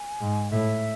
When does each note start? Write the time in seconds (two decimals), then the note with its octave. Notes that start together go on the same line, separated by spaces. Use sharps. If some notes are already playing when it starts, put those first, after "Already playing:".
Already playing: G#5
0.21 G#2
0.51 A2 E5